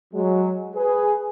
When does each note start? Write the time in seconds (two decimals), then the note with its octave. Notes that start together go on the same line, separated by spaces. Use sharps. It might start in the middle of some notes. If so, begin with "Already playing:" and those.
0.14 F#3 G#3
0.76 G#4 B4